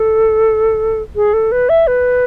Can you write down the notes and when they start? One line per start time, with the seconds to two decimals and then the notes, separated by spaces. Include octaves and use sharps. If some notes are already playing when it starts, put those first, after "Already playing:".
Already playing: A4
1.16 G#4
1.33 A4
1.52 B4
1.69 E5
1.87 B4